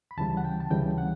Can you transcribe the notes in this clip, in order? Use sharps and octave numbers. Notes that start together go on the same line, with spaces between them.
B5
D2 C#3 E3 G3 A5
F#5
G5
A5
D2 C#3 E3 G3 G5
F#5